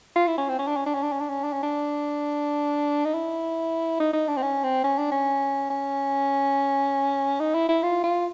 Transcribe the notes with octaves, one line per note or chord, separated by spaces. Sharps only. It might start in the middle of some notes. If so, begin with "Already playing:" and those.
F4
E4
C#4
C4
C#4
D4
C#4
D4
C#4
D4
C#4
D4
C#4
D4
C#4
D4
D#4
E4
D#4
D#4
D4
C4
C#4
C4
C#4
D4
C#4
C#4
D#4
E4
E4
F4
F4